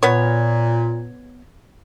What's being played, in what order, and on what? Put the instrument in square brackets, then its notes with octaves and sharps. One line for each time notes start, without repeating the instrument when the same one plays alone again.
[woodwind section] A#2 [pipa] B3 C#5